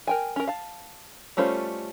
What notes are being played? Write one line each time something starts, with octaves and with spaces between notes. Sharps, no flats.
A#4 G5 G#5
C#4 A#4
F5 A5
G3 A3 C#4 F4 C5